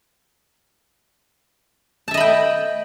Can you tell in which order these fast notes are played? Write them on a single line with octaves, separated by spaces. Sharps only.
A5 E5 D#5 B5 G5